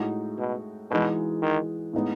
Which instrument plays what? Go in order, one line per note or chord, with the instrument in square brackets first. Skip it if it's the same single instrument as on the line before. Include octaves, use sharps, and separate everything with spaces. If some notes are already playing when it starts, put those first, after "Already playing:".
Already playing: [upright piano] A2 G#3 D#4 F#4
[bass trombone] B2
[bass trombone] B2 [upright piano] E3 G#3 D#4 F#4
[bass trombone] D#3
[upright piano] A2 G#3 B3 D#4